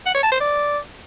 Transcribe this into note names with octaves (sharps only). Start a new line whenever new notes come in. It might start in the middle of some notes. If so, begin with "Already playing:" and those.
F#5
C#5
A5
C5
D5